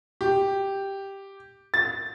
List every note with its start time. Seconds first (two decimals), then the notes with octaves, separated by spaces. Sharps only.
0.21 G4
1.74 A6